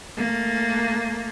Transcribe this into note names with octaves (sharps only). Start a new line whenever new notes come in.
A3 A#3